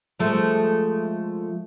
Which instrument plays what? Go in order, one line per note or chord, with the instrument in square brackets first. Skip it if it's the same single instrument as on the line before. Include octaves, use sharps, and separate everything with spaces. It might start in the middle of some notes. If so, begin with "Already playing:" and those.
[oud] F3 G#3 A3